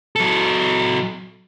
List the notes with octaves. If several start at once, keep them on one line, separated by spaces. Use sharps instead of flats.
F#3 A4